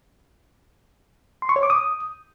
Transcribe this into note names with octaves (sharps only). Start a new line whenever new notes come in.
C6
C#6
C#5
D6
D#6